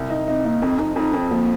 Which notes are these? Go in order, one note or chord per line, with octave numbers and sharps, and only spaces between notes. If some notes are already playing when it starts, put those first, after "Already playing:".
Already playing: C2
D#4
C4 D#4
A#3 D#4
F2 C4
F2 D#4
F2 D#4
F2 C4
F3 A#3